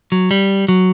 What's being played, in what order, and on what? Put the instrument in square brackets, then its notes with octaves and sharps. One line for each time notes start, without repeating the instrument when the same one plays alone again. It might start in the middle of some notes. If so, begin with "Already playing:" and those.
[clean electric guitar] F#3
G3
F#3